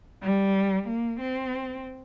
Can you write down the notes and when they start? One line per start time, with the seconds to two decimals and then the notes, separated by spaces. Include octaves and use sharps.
0.24 G3
0.88 A#3
1.21 C4